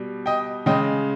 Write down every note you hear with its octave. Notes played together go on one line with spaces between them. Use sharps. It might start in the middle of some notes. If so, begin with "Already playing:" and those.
Already playing: B2 G3
D#5 G5
C#3 G#3 D#5 G5